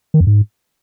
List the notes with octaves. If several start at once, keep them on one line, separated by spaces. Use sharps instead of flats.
D#3
F2
G#2